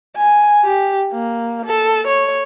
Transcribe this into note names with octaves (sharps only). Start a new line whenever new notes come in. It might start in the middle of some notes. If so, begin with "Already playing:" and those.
G#5
G4
A#3
A4
C#5